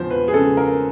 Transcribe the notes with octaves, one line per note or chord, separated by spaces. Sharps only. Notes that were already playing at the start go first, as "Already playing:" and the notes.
Already playing: E2 F3 C5
B4
G#4
C#3 A4
A#4